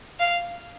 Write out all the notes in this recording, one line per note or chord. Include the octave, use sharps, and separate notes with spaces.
F5